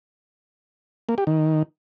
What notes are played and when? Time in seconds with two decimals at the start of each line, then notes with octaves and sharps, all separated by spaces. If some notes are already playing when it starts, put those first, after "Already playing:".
1.09 A#3
1.18 G4
1.27 D#3